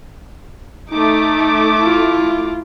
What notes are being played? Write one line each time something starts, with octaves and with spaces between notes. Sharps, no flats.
A3 D#4 D6
E4 F4